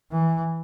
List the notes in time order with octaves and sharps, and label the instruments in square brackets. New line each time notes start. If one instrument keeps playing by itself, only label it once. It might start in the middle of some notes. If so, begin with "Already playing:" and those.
[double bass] E3